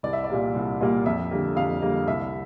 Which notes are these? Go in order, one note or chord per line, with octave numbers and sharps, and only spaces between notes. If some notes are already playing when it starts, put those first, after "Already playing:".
C2 D5
E5
D5
A#2 G3 A#3
C2
A#2 G3 A#3
F2 E5
D3 G3 A#3
F2 F5
D3 G3 A#3
C2 E5